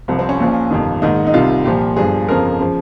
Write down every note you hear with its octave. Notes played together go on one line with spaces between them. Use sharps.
C2 C3 F3
C4
C#4
A#1 A#2 F3
G1 F2 C3 D#3
A#1 G#2 D#3 D#4
D#4
C2 C3 D#3 F4
C2 A#2 F3 G4
G1 G2 F3 G#4
G1 F2 C#3 F3 A#4
C#3 F3